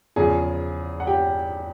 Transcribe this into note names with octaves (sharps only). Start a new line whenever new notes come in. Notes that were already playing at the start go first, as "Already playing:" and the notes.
E2 C#3 F3 G#4 G#5
F#5
G4 G5